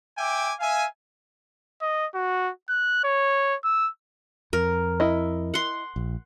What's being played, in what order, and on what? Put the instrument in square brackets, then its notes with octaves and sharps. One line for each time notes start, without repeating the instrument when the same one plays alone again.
[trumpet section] E5 G5 G#5 D6
E5 F5 G#5
[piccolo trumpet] D#5
F#4
F#6
C#5
E6
[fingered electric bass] F2 [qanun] A#4
[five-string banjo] E4 D#5
[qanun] F#5 C6
[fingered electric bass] A#1